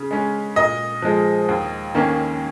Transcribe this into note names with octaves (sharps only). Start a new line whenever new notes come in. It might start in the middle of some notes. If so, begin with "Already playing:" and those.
Already playing: C#3
G#3 C#4
A#2 D#5
F3 G#3
D#2
D#3 A#3 C#4